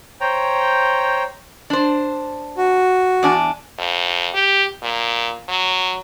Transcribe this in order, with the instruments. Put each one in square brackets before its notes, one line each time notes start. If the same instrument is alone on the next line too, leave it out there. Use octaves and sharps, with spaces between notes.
[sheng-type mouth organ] C5 C#5 G5 A#5
[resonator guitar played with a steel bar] D4 C5
[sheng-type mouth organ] F#4
[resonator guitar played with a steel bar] E2 D4 G#5
[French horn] F2
G4
A#2
F#3